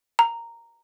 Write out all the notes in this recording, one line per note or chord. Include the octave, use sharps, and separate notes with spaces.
A#5